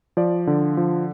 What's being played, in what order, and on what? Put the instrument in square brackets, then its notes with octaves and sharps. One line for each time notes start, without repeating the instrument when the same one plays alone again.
[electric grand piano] F3 D5
D3
F3